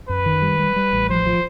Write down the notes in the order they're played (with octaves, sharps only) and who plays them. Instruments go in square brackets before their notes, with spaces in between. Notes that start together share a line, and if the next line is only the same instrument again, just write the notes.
[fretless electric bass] F#2 [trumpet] B4
[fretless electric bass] D#3
G3
G3
G3
A1
[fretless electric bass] F3 [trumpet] C5
[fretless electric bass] F3